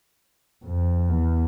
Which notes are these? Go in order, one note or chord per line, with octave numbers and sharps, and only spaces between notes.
F2
E2